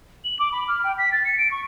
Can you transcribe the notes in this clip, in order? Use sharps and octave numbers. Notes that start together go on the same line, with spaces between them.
F#7
D6
B5
F6
G5
B6
A6
C#7
D7
C#6